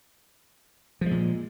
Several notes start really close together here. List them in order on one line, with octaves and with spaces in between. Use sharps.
F3 G#3 A#2